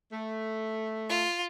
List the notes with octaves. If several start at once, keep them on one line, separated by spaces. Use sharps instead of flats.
A3
F4